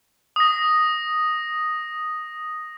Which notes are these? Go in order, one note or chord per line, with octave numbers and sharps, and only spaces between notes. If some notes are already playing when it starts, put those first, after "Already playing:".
D#6 A#6